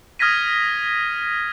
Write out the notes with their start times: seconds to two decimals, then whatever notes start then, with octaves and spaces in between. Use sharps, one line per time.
0.19 D#6 F6 G#6 A#6 B6 D#7